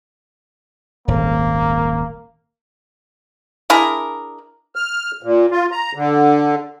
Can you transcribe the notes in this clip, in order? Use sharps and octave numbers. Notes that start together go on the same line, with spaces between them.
D#1 G#1 A#3
D4 E4 G#4 A#4
F6
A#2
F4
A#5
D3